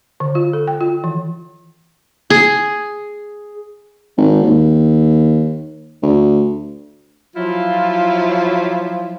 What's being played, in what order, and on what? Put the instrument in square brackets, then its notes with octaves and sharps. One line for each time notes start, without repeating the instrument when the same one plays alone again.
[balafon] D3
F4
A4
G5
F4
E3
[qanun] G#4
[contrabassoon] G#1
D#2
D2
[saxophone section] F3 F#3 E4 F4